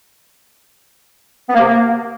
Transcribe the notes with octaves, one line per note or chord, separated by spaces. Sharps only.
B3
A#3
C3
A#3